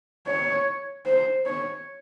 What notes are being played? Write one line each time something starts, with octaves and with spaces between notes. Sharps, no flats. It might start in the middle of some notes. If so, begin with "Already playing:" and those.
C#5
C5
C#5